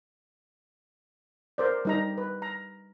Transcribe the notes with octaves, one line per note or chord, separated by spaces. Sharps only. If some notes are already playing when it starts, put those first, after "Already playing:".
A#4 C5 D5
G3 D#4 A#5
B4
A#5